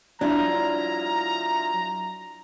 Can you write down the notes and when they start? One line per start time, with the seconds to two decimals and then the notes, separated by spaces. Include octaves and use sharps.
0.21 F#3 D4 E4 F4 A#5